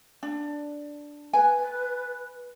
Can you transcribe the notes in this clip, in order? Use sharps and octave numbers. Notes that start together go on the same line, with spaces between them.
D4
B4 G#5